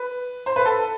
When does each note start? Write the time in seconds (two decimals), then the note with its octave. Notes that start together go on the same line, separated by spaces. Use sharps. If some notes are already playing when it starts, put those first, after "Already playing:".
Already playing: B4
0.46 C5
0.56 B4
0.65 A4